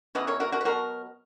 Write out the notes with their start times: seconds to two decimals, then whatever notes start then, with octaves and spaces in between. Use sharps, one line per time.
0.15 C#3 E3 B3 B4 D#5
0.27 A#4 C#5
0.40 F#4 A#4
0.52 F#4 A#4
0.61 B4
0.65 B2 F#3 B3 F#4 A#4